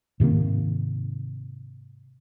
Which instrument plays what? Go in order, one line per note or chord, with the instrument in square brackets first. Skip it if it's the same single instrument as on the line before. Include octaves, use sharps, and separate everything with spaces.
[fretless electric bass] G#2 C3 D#3 A#3